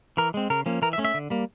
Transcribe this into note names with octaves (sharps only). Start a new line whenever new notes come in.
E3 A#4
G#3 C4
C#3 A#4
F3 A#3 C#4
E3 A#4
E5
A3 C#4
E5
D3
G3 A#3